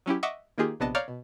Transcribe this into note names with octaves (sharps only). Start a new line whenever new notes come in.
F#3 C#4 E4 G4
D#5 E5 F#5 C#6 D6
D#3 A#3 D#4 F4 G4 G#4
A#1 C3 B3 D4 D#5 A5
C#5 D5 F5 A#5 F6 G6
B2